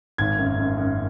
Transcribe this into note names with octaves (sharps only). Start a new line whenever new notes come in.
G#1 G#6
F#2
F#2
F#2